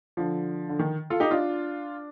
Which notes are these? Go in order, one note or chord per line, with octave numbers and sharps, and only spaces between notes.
D3 F3
D3
D#3
F4 A4
D#4 G4
D4 F4